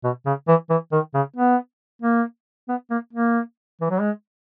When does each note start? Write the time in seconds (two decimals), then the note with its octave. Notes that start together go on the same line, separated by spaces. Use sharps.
0.04 B2
0.26 C#3
0.48 E3
0.70 E3
0.92 D#3
1.14 C#3
1.36 B3
2.02 A#3
2.68 B3
2.90 A#3
3.13 A#3
3.81 E3
3.90 F#3
4.00 G#3